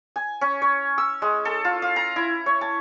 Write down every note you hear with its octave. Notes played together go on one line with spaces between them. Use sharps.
G#5
C#4
C#5
E6
G#3
A4
F4
F5
A#5
E4
C#5
A5